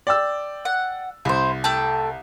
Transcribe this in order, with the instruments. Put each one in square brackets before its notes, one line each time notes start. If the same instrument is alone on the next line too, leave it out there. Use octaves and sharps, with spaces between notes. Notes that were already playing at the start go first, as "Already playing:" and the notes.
[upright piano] D5 G5 E6
[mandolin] F#5
[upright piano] C2 [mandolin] E4 C5
[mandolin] A3 G5 A5